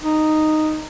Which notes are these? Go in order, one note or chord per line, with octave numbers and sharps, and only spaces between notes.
D#4